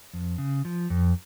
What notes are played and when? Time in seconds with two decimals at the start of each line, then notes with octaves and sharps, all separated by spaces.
0.14 F2
0.38 C#3
0.65 F3
0.90 F2